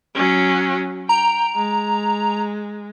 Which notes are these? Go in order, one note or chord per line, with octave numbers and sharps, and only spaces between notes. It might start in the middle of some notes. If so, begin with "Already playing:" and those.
F#3 C#4
G5 A#5
G#3